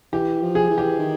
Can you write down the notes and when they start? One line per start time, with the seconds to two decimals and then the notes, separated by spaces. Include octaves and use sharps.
0.13 E3 G4
0.42 F3
0.55 G#4
0.70 E3
0.78 G4
0.99 D#3